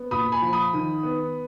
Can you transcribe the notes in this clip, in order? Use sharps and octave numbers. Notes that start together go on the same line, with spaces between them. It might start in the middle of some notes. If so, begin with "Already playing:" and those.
Already playing: B3
A#2 B5 D#6
G#5 B5
F3
B5 D#6
D#3
B3